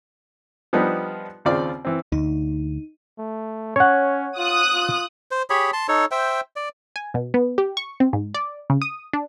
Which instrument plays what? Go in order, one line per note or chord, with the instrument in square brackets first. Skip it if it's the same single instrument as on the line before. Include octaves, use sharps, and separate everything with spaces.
[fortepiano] F3 G3 B3 D4 D#4
D#2 C#3 C4 F4 D5 D6
E3 C4
[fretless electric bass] D2 [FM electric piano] D#4
[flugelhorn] A3
[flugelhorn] C#4 [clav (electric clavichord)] C#5 F#5
[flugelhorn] F4 [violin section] D#6 F#6
[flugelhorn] F4
[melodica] C5
G4 G#4 C#5 B5
A5 C6
D#4 A4 C#5
C5 E5 G5
D5
[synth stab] G#5
B2
B3
G4
C#6
C4
G#2
D5
C#3
D#6
D4